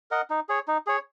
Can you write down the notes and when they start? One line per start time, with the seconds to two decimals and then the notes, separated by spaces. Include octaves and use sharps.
0.11 A#4 D#5 F#5
0.30 D#4
0.49 G#4 C#5
0.68 D#4
0.87 G#4 C#5